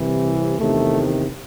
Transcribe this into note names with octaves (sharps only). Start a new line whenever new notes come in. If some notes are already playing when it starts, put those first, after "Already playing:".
Already playing: C2 C3 E3
E2 C3 D#3 A3